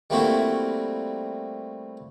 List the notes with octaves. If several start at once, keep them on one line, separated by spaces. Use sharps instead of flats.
G3 A3 A#3 C4 E4 F#4